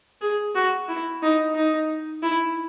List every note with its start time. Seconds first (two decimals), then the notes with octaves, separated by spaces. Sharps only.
0.21 G#4
0.55 F#4
0.89 E4
1.22 D#4
1.55 D#4
2.23 E4